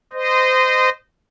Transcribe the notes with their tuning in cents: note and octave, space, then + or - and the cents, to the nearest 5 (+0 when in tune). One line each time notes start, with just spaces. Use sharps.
C5 -25 D#5 -15